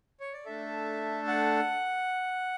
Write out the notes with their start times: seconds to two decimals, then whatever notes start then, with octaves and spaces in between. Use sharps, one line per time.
0.20 C#5
0.33 D5
0.46 A3 D4 A4 E5
1.28 F#5